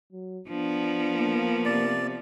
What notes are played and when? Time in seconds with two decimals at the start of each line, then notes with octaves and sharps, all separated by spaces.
0.12 F#3
0.49 F3 B3 D4
1.13 A#3
1.65 C3 D5